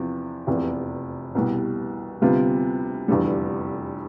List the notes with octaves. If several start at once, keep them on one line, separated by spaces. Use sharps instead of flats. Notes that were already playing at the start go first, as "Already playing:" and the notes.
Already playing: E2 C3 F3
F1 E2 C3
C2 B2 G3
D2 C3 G3 B3 F4
F1 E2 D3 G3